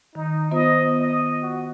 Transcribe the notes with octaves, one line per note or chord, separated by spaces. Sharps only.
D#3 D#4
B3 F4 C5 D#5
D#5
F#4